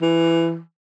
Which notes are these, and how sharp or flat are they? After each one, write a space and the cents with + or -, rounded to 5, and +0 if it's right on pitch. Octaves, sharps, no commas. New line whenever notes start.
E3 +15